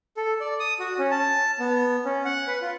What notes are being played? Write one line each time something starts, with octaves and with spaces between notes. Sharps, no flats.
A4
D5
D#6
F#4
C#4
A5
B3
C#4
F#5
B4
F4